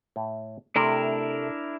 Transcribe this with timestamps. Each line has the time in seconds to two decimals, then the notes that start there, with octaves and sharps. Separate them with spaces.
0.16 A2
0.76 C3 A3 D4 E4 A#4